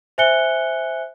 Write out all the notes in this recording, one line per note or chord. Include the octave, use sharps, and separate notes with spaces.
C5 E5 G#5 F#6 C#7 G7